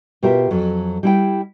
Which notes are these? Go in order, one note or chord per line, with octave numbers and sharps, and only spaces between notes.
B2 F4 G4 A#4 E5
F2 F#3
G3 E4 G5